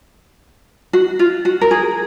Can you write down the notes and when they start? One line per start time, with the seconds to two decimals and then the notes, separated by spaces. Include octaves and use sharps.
0.93 F#4
1.19 F4
1.45 F#4
1.61 A#4
1.71 G#4